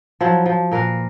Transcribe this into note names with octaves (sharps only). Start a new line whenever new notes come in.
F3 F#3 E4
F3
A#2 A#4 B4 F5